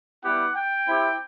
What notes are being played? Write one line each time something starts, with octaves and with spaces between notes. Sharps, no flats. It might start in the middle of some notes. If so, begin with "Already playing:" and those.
G3 B3 E4 G4 F#5
G5
C4 E4 G4